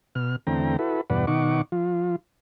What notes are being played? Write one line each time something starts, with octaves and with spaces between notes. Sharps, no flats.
B2 F6
E2 D3 A3 C4 G5 A#5
E4 F#4 A4 B4
E2 G2 B2 B4 D5 F#5
B2 D#3 D#4 F#5 C#6 D6
F3 F4